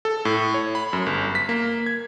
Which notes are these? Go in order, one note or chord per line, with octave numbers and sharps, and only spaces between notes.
A4
A2
C#5
B5
F#2
G1
B6
A#3
G#6